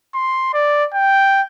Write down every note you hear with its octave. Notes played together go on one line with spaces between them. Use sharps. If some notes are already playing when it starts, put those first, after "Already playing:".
C6
D5
G5